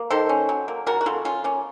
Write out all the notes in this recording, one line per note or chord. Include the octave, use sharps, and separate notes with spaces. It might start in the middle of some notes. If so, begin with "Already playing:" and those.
Already playing: A#3
D#3 A4 C5
C#4
F#3
A#3
C#3 F#4 A#4
F#4
C#3 F4 A4
F3 C#4 F4
A#3 C#4